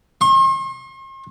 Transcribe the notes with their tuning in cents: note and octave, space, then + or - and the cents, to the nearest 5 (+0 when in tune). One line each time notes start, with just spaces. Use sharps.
C6 +45